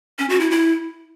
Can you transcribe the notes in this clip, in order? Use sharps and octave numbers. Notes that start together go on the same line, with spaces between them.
C#4
F#4
E4
E4